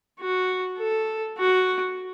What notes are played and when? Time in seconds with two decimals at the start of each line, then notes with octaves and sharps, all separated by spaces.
0.20 F#4
0.78 A4
1.38 F#4